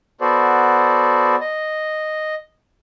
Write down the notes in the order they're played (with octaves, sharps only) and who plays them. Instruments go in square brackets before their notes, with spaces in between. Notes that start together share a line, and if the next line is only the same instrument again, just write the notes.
[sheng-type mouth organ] B3 F#4 A4 C5 D5
D#5